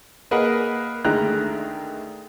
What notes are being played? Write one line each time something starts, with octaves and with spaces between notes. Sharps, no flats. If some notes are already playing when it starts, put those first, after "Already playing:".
A#3 G#4 A#4 B4 D#5 F#5
D2 D3 D#3 G#3 A#5 F#6